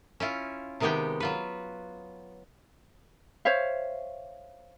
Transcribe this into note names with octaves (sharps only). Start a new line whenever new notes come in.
C#4 E4 F4
C3 D#3 G#3 B3 G4 G5
F#3 F4 B4
C5 C#5 E5 F5